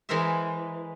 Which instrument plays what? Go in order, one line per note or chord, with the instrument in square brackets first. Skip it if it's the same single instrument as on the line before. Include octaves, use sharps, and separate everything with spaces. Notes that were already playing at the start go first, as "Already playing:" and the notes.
[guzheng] E3 G#3 G#4 A#4 C5 E5